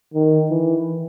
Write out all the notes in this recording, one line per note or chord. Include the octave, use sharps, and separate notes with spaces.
D#3
E3